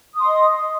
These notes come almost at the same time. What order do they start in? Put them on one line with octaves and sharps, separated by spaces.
D#6 C6 D#5